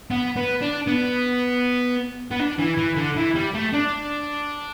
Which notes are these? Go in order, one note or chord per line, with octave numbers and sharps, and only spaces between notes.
B3
B3
D4
B3
B3
D4
E3
E3
D3
E3
G3
A3
D4